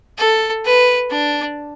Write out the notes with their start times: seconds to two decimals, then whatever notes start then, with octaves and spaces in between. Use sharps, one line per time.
0.18 A4
0.65 B4
1.10 D4